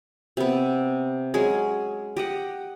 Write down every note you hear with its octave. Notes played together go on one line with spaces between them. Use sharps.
C3 B3
F#3 G#3 C#4 G#4
G4 D#5 F#5